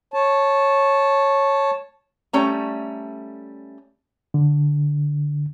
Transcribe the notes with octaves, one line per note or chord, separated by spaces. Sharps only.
C#5 A5
G3 A3 C#4 A#5
D3